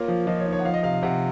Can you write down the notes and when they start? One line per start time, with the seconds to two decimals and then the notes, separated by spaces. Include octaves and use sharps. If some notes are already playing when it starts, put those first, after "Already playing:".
Already playing: A#3 F4 C#5
0.08 F3
0.27 F3 D#5
0.40 C#5
0.46 D#4
0.52 C#5
0.59 F#5
0.65 F3 F5
0.74 D#5
0.83 C3 F5
0.94 F5
1.03 C3 F#5